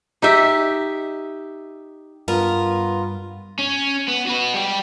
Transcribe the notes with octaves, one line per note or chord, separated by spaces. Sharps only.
D#4 G4 E5
G2 B3 F4 A#4
C#4
B3
F#4 B4
G3 G5